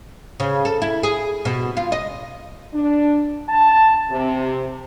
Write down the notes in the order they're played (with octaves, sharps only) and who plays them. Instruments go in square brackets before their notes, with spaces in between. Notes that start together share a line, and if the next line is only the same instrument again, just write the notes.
[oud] C#3
A4
E4
G#4
B2
F4
D#5
[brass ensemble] D4
A5
C3